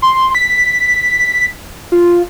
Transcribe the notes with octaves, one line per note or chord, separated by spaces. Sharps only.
C6
B6
F4